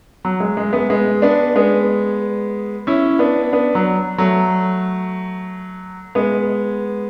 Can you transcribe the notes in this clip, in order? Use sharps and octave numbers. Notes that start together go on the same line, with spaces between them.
F#3
G#3
G#3
G#3 B3
G#3 B3
B3 D4
G#3 B3
C#4 E4
B3 D4
B3 D4
F#3
F#3 A3
G#3 B3